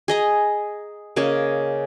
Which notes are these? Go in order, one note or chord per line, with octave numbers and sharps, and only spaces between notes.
G#4 D#5 A#5
C#3 A#3 C#5 D#5